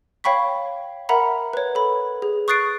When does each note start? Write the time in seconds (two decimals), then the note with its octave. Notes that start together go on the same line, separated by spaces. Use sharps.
0.24 C#5 F5 G5 B5 C#6 B6
1.09 A#4 E5 F#5 A#5 B5
1.53 B4 C#5
1.75 A4 B5
2.22 G#4
2.48 C#6 D#6 F#6 A6 C7 D7